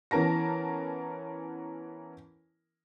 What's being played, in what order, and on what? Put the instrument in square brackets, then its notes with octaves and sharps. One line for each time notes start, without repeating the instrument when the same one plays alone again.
[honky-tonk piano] E3 B3 C#4 A#4 A5 A#6